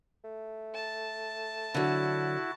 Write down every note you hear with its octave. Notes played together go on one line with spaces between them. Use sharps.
A3
A5
D3 F#3 E4 F#4